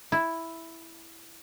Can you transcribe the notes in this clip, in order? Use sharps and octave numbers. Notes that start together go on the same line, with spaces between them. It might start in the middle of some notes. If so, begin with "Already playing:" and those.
E4